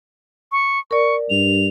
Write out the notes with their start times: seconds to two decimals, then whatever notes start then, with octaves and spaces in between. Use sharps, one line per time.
0.52 C#6
0.91 A#4 D5 C#6
1.30 G2 F7